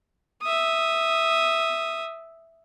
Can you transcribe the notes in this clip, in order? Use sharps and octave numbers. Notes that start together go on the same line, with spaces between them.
E5 D#6